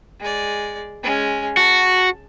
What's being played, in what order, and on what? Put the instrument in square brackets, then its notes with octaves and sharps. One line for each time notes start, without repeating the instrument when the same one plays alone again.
[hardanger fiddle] G#3 D5
G#3 C#4
[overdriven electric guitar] F#4 [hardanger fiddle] A5